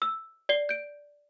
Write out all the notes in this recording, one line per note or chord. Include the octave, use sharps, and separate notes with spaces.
E6
D5 C7 G7
G6 D7